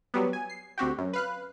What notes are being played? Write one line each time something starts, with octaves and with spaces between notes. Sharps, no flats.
F#3 G3 B3
G#5
C7
D2 C4 F#4 G4
F#2
B4 F5 F#6